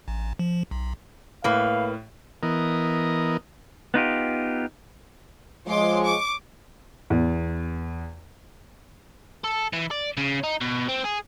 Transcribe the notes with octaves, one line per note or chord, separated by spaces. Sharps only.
A1
F3
B1
A2 A#3 B4 F5
E3 B3 A#4 D#5
B3 D#4 F4 G4
F3 G#3 C#5 C6 D6
C#6 D6
E2
A4
E3
D5
C#3
D#4
B2
C4
G#4